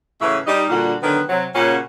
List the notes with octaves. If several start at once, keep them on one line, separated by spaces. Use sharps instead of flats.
A2 C#3 E3 F#4 B4 E5
G3 D#4
A#2 D3 G3 D4 F#4
D3 D#3 F#3 B3 B4
C3 F#3
A#2 C#3 A#3 C#4 F#4